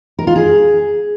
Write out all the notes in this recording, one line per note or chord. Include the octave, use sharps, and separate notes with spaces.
A#4
F4
G#4